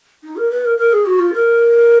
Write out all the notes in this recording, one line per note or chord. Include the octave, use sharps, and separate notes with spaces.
D#4
A#4
B4
A#4
A#4
G#4
F#4
F4
A#4